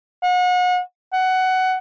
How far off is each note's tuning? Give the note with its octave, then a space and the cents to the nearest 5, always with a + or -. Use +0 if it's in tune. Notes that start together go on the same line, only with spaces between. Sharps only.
F#5 -35
F#5 +15